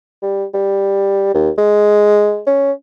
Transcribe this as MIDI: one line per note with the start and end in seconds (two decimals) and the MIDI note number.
0.22 0.45 55
0.54 1.33 55
1.34 1.50 39
1.58 2.41 56
2.47 2.72 61